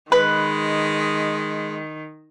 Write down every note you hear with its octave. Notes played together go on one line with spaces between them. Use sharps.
D#3 G#3 B4